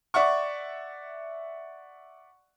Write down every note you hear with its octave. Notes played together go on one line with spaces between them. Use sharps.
D5 E5 F#5 C#6